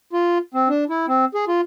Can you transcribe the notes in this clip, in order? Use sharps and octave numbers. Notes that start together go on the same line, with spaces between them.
F4
C4
D4
E4
C4
G#4
F4